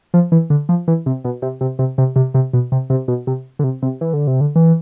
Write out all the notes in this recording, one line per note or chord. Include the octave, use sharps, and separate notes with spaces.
F3
E3
D3
F3
E3
C3
B2
C3
C3
C3
C3
C3
C3
B2
C3
C3
B2
C3
D3
C3
C3
E3
D3
C3
D3
E3